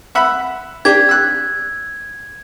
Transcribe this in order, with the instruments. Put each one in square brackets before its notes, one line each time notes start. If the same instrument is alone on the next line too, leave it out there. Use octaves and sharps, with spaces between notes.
[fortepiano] E5 F#5 B5
[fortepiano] D4 G4 [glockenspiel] G#6
[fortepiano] E6 F#6